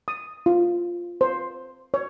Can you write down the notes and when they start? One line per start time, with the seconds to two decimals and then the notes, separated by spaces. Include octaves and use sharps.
0.08 D#6
0.46 F4
1.21 C5
1.94 C#5